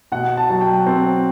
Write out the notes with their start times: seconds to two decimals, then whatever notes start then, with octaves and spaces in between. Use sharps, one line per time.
0.12 B2 F#5
0.37 A5
0.50 F#3
0.61 G5
0.86 C4